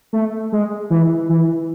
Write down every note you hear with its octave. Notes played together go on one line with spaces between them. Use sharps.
A3
G#3
E3
E3